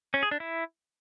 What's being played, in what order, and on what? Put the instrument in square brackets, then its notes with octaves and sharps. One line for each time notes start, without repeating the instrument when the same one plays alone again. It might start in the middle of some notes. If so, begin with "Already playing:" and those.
[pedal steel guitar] C#4
G#4
D4
E4